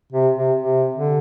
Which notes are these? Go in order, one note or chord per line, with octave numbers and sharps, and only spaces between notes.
C3
C3
C3
D3